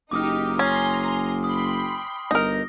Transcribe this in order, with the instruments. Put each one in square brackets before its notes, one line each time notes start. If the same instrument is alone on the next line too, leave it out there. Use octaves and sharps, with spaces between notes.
[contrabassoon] F#1 [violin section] D#4 G4 [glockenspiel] D6 D#6 F6
[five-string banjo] C#4 [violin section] G#5 A#5 C6
[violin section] G5 B5 C6 [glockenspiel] D#6
[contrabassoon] G1 [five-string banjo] D#4 A#4 [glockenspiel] A#6